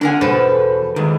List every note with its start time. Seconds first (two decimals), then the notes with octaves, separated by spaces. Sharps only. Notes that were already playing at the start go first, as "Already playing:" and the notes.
0.01 D3 D4 A#4 F#5 G#5
0.21 E2 B2 A4 B4 C5
0.96 E2 D#3 G#3